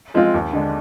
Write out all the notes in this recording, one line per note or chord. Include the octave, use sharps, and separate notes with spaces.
F3 G#3 C4 F4
D#2
D3 G#3 D4